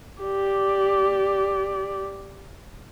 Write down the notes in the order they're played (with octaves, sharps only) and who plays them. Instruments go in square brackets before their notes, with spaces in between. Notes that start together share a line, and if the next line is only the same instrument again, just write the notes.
[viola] G4 D5